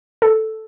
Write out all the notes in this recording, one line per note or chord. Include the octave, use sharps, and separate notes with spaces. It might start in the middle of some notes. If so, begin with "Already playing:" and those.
A4